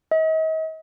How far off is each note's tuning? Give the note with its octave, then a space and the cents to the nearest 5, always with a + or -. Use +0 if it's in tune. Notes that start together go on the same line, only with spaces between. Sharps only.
D#5 +40